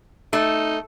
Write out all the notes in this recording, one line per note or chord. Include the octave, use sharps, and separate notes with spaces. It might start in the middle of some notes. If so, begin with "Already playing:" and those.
A3 D#4